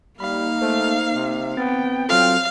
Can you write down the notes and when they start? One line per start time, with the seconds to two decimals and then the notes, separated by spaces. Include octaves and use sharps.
0.20 G3 A#3 D#4 F5 B5
0.62 A3 C5
1.15 C3
1.57 B3 C4 G5 A6
2.09 F#3 C4 F4 A4 F5